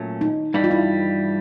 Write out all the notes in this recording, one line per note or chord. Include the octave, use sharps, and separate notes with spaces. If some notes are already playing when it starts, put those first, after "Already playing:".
Already playing: A#2 F#3 A3 C#4
D#4
G2 E3 G3 D#4
F4
E4